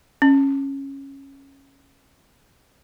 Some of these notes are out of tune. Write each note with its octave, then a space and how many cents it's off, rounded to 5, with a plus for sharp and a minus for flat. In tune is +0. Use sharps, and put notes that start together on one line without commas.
C#4 -15